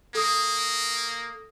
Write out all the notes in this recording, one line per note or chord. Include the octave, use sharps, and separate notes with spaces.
A#3 A4 D#6